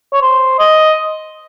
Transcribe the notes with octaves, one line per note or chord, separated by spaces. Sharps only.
C#5
C5
D#5